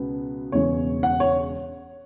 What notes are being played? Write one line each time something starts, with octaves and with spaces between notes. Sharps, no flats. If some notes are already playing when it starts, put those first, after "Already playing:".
Already playing: C#2 B2 B3
E1 E2 C#3 G#3 B3 C#5
F#5
C#5